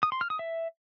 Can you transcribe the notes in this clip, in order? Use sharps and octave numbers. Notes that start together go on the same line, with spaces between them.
D#6
C6
F6
D#6
E5